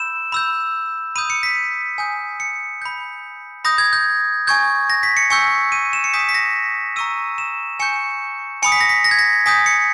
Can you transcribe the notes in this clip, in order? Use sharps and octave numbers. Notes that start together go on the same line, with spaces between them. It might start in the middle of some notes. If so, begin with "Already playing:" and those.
Already playing: B5 E6 G6 E7
B5 E6 G6
B5 D#6 G6 D#7
C#7
B6
G#5 D#6 G6
C#7
B5 G6
B5 D#6 G6 A#6
G#6
G6
G#5 C#6 G6 G#6
A#6
B6
C#7
G#5 C#6 E6 G6 C#7
D#7
E7
C#7
G#5 D#6 G6 B6
B6
A#6
A#5 C#6 E6 D#7
E7
G#5 C#6 G6 C#7
G#5 B5 D#6 C#7
B6
A#6
B6
A#6
G#6
A#6
G#5 D#6 G6 B6
C#7